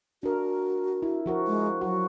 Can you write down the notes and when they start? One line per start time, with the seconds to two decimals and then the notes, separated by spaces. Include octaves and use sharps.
0.23 D4 F#4 A#4
1.02 E4
1.26 F3 F#4 A#4
1.47 G#3
1.81 F#3 F#4